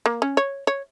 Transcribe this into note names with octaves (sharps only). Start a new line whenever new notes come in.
A#3
C#4
C#5
C#5